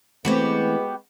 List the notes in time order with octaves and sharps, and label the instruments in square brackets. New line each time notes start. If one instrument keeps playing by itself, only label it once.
[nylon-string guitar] E3 A3 C4 [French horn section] G#3 B4 [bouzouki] B3 F#4 G4